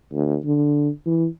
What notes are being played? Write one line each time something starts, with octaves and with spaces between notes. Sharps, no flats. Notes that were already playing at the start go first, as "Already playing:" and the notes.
D2
D3
E3